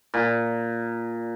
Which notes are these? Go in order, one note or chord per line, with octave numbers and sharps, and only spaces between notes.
A#2